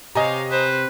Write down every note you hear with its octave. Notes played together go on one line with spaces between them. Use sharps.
C3 C#5 D#5 F5 G#5 A#5
B4 C5